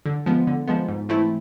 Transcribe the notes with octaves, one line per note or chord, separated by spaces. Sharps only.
D3
F3 G#3 B3
D3
F3 G#3 B3
G#2
E3 A3 C4 E4